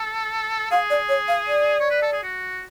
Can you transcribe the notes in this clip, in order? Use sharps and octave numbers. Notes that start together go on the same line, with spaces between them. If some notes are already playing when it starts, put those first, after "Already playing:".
Already playing: A4
G#4 F5
D5
C#5
F5
D5
C#5
B4
A4
G#4
F#4